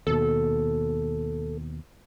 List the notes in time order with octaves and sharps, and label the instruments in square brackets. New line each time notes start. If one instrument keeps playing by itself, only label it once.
[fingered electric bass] D#2 B2 [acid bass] A4